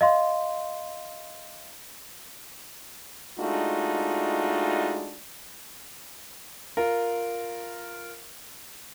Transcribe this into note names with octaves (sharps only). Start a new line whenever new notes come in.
D#5 F5 C6
G#3 A3 D4 D#4 F4 F#4
F4 A#4